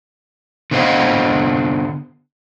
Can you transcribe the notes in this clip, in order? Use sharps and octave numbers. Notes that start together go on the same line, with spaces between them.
D3 A3 B3 C5 D#5 F5